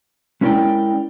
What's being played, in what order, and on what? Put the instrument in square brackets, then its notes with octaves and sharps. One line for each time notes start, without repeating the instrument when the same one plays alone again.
[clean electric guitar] G#3 C#4 E4 A#4 D5 G5